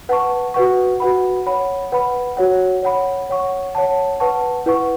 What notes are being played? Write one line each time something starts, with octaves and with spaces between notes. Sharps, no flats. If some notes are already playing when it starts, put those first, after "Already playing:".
B4 F#5 A5 C#6
F#4 B4 F#5 C#6
F#4 B4 F#5 B5
C#5 F#5 B5
B4 F#5 B5
F#4 C#5 F#5
C#5 F#5 B5
C#5 F#5 C#6
C#5 F#5 A5
B4 F#5 A5 C#6
E4 B4 F#5 C#6